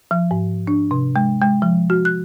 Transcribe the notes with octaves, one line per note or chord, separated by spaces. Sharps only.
F3
G#2
D4
C3
G#3
G#3
F3
F#4
F#6